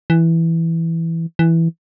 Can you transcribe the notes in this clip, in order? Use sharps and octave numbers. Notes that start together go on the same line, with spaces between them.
E3
E3